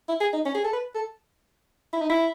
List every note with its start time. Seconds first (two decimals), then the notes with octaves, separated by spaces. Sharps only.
0.09 E4
0.21 G#4
0.33 D#4
0.46 C#4
0.55 G#4
0.64 A4
0.73 B4
0.95 A4
1.93 E4
2.01 D#4
2.10 E4